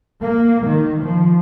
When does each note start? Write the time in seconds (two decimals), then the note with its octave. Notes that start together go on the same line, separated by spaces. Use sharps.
0.22 A#3
0.67 D#3
1.03 F3